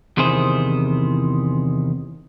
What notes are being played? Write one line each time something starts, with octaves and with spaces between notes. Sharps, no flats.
E2 C3 D#3 E4 G#4 C5